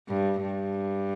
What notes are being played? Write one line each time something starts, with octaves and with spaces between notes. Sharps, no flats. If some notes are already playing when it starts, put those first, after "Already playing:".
G2
G2